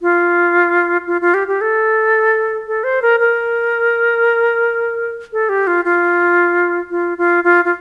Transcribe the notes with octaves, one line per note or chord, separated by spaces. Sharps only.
F4
F4
F4
G4
G4
A4
A4
C5
A#4
A#4
A4
G4
F4
F4
F4
F4
F4
F4